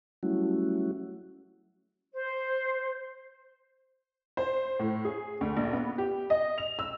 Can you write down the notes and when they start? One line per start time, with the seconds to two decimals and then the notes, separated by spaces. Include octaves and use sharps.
0.23 F#3 G3 A3 C#4 E4 F#4
2.12 C5
4.37 C5
4.79 A2
5.05 G#4
5.41 D2
5.56 A#1
5.73 B3
5.98 G4
6.30 D#5
6.58 F7
6.79 E6